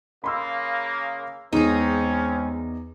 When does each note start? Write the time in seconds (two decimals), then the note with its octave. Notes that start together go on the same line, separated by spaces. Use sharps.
0.24 C#3 A#3 B5 C6 E6
1.53 E2 G#3 C4 C#4 D#4 G#4